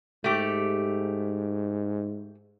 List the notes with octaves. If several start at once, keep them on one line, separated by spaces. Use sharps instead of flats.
G#2 A3 G4